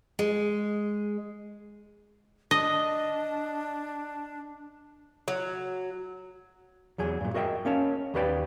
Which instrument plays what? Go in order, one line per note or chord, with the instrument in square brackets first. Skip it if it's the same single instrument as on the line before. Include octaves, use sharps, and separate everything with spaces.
[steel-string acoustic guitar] G#3
[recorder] D4 [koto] D#5
[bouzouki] F#3
[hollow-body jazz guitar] E2 F#3 G#4
G2 A#2
F#4 A#4 D#5 E5 G5
A#3 C#4 A#4 C#5 A5
D#2 F#4 G4 B4 D5 G5